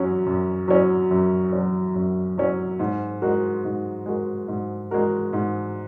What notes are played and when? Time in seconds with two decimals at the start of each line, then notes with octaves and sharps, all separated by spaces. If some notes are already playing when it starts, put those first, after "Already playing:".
Already playing: F#2 F#3 C#4
0.26 F#2
0.68 F#3 C#4
1.11 F#2
1.52 F#3 C#4
1.95 F#2
2.38 F#3 C#4
2.79 G#2
3.22 G#3 F#4 A#4
3.65 G#2
4.06 G#3 F#4 A#4
4.48 G#2
4.91 G#3 F#4 A#4
5.33 G#2